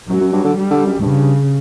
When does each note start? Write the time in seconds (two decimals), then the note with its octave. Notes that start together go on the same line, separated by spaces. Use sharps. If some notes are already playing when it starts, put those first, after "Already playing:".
0.08 F#2 F#3
0.20 F#2
0.33 G2
0.44 D3
0.55 G3
0.70 D3
0.86 F#2
1.01 G2 C#3